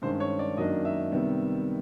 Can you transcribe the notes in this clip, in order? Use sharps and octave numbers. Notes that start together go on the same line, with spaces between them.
G2 D#3 G#3 C#4 C5
C#5
D5
F#2 D#3 F#3 A#3 D4 D#5
E5
C3 D#3 G3 B3